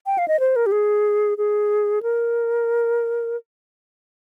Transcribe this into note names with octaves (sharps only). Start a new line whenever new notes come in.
G5
F5
D#5
C5
A#4
G4
G#4
G#4
A#4